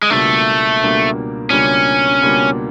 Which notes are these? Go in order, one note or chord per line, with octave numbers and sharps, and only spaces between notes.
G#3
C#2 B2 G3 A3 A#3 D4
C#2 B2 G3 A#3 D4
C#2 B2 G3 A#3 C#4 D4
C#2 B2 G3 A#3 D4